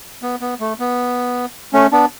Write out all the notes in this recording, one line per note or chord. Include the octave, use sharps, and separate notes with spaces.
B3
B3
A3
B3
A3 C#4
B3 D4